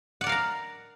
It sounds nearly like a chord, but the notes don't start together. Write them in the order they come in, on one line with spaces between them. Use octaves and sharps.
F#5 D5 A#4 F5 A#5